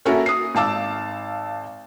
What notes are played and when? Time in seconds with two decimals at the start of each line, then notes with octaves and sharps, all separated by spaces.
0.05 A#3 C#4 E4 F#4 A4 A#4
0.26 D#6 C7
0.55 G#1 F5 A5 D6 E6